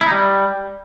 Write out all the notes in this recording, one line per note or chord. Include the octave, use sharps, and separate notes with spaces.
E4
D#4
G3